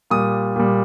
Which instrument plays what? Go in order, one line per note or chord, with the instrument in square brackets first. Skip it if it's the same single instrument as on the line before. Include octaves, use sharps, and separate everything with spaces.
[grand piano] A#2 G3 D#6
A#2 G3